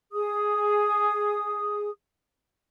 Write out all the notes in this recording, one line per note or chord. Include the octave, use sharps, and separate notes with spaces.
G#4 D#6